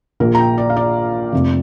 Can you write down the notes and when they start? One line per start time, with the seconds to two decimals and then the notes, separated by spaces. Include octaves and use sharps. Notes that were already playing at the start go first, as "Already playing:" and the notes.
0.20 A#1 A#2 A#3 A#4
0.35 A#5
0.39 G5
0.58 D5
0.70 F5
0.77 D5
1.32 F1 F2 C3